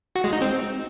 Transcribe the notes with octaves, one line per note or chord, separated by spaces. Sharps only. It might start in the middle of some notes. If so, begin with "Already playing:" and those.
F#4
G#3
D#4
C4